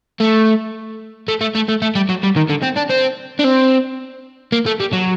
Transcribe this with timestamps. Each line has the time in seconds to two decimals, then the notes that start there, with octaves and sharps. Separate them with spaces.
0.20 A3
1.28 A3
1.41 A3
1.55 A3
1.69 A3
1.82 A3
1.95 G3
2.09 F#3
2.23 G3
2.36 D#3
2.50 D3
2.63 C4
2.77 D4
2.90 C4
3.39 D4
3.45 C4
4.52 A#3
4.66 A3
4.80 G3
4.93 F#3